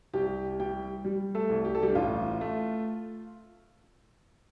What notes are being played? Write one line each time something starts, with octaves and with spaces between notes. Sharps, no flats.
C2 G4 G5
G3 G4 G5
G3
A3 A4
C2
G4
A4
G3 G4
D4
A1 F4
A3